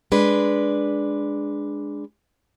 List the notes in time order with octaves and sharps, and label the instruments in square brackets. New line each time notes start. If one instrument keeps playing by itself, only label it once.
[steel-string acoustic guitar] G#3 D4 B4